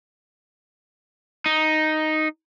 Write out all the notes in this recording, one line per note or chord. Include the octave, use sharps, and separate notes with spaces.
D#4